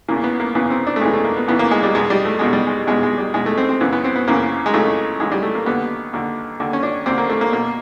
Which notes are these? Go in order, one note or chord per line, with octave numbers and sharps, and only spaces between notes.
E2 C#3 E3 A#3
B3
A#3
E2 C#3 E3 B3
C4
D4
A3
E2 C#3 E3 G#3
A3
A#3
B3
E2 C#3 E3 B3
A#3
G#3
G3
E2 B2 G#3
G3
A3
E2 B2 G#3
G3
G#3
E2 B2 G#3
G#3
G3
E2 B2 G#3
A3
C4
C4
F#2 C#3 E3 B3
B3
C4
B3
F#2 C#3 E3 A#3
G#3
F#2 C#3 E3 A3
F#2 C#3 E3 G#3
G3
A3
A#3
D#2 D3 B3
D#2 D3
D#2 D3
C#4
D4
D#2 D3 C4
A#3
A3
A#3
B2 A#3